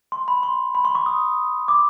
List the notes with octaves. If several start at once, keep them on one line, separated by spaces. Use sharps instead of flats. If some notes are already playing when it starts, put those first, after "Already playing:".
C6
B5
C6
B5
C6
C#6
D#6
D6